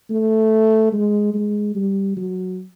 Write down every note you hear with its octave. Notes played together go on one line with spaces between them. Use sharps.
A3
G#3
G#3
G3
F#3